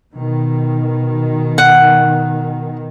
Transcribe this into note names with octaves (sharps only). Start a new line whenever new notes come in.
B2 D#3
F#5